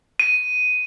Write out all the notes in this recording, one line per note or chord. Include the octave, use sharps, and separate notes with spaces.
D#7